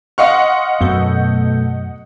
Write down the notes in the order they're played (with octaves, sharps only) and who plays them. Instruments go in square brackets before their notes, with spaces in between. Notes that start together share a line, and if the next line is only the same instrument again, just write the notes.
[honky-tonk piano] D#5 F#5 C#6 [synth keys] F5 C6 F6
[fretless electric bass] F#2 [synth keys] B2 A3 G6